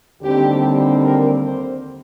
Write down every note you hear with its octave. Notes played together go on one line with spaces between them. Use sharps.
D#2 D3 G3 C4 G4
A#4
C5